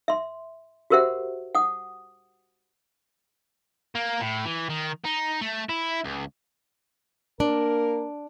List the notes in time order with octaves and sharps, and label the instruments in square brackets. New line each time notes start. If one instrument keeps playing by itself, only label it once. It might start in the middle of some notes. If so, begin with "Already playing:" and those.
[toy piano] E5 C6
F#4 G4 A#4 C5 E5 F#5
F#5 D#6
[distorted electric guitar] A#3
A2
E3
D#3
D#4
A3
E4
C#2
[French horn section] A#3 A#4 [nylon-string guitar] D4